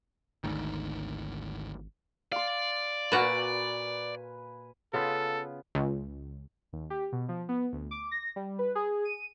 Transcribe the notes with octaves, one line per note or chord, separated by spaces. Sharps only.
G#1 D2 G#2 D#3
D5 F5 C6
A#2 F#4 B4 G#5
C#3 B3 F4 A4
C#2
D#2
G4
B2
F3
B3
D2
D6
A#6
G3
B4
G#4
D#7